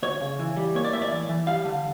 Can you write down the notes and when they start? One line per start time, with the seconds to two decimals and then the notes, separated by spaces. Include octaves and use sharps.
0.03 D2 C#5
0.20 C#3
0.39 E3
0.57 G3
0.75 A#3 C#5
0.85 D5
0.93 A2 E5
1.02 D5
1.12 E3
1.29 E3
1.47 G3 F5
1.65 D3